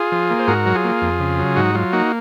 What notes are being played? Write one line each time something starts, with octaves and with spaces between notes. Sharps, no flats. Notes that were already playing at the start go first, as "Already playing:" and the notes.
Already playing: F4 G#4
F3
A#3
C5
G#2 F#4 A#4
F#3
F4 G#4
A#3
F2
C#3
F#3
G#2 D#4 F#4
F#3 F4
A#3 D#4 F#4